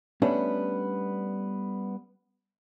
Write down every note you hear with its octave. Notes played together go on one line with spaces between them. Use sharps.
G3 A3 B3 C#4 D4